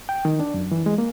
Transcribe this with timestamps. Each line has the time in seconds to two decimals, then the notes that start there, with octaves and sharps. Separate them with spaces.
0.09 G5
0.25 D#3
0.40 D4
0.54 F#2
0.71 E3
0.86 G#3
0.98 A#3